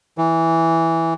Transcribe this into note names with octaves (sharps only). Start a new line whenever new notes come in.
E3